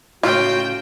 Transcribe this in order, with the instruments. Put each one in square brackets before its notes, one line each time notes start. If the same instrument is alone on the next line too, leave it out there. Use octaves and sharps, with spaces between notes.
[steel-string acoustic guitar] A2 C#3 C#4 [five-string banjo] F4 [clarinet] F#4 [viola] G5